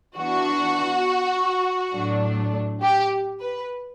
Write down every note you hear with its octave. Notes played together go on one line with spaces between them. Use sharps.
E3 B3 D4 F#4
A2 F#3 A3 D4
G4
B4